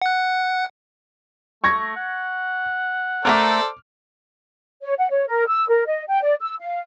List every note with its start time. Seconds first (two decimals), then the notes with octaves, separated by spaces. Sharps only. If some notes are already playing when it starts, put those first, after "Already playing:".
0.02 F#5 F#6
1.64 A3 C#6 G#6 A#6
1.97 F#5
3.25 A3 A#3 A4 A#4 C5 D5 D6 F6
4.82 C#5
4.98 F#5
5.09 C#5
5.27 A#4
5.48 E6
5.69 A#4
5.86 D#5
6.08 G5
6.23 D5
6.41 E6
6.60 F5